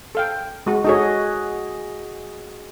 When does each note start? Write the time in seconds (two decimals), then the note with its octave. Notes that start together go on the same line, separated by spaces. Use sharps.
0.15 A4 F5 G5
0.66 G#3 F#4
0.84 D#4 F#4 G#4 A4 C#5 D#5